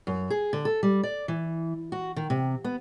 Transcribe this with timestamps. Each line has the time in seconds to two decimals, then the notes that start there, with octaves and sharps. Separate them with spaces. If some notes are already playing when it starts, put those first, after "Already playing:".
0.07 F#2
0.30 G#4
0.53 D3
0.65 A4
0.83 G3
1.03 D5
1.28 E3
1.92 F#4
2.16 D#3
2.30 C3
2.64 B3